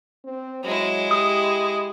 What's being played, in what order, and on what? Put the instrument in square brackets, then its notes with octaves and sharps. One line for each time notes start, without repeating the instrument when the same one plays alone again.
[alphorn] C4
[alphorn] F#3 [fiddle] G#3 E4
[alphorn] G4 [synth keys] D#6